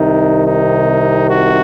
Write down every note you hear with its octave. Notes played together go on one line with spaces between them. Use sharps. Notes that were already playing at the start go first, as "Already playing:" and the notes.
Already playing: C2 C3 D#3 D#4
D#4
F#4